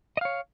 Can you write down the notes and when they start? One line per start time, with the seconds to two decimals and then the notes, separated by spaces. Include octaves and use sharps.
0.17 D#5
0.21 F5
0.25 C#5